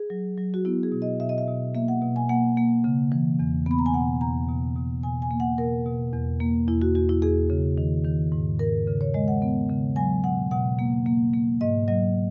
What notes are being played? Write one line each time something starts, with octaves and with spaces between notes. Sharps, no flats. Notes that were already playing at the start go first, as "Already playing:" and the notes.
Already playing: G#4
F#3
F#3
F#4
B3 E4
G#4
B2
D#5
B2 E5
D#5
E5
B2
A#3 E5
F#5
B2
G#5
A#3 F#5
A#3
C#3
E3
E2
B3 B5
A#5
G#5
B2 F#5
E2 A#5
B2
B2
B2 G#5
G#5
A#3
F#5
B2 A#4
B2
E2
A#3
E2 E4
F#4
E2 F#4
E4
E2 G#4
C#3
D#3
D#3
G#2
G#2 A#4
C#3
C#5
G#3 D#5
F#5
B3
C#3
F#3 G#5
B2 F#5
B2 F#5
A#3
A#3
A#3
G#2 D#5
F#3 D#5